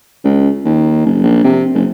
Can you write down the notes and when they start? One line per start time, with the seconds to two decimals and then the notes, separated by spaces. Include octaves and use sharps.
0.24 C#2
0.65 D#2
1.06 F#1
1.24 A#1
1.44 C3
1.74 F#1